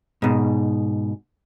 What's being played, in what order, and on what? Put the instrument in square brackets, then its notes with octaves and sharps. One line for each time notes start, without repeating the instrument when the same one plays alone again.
[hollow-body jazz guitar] G#2 B2